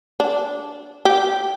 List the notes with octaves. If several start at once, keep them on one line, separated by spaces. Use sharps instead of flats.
D4
G4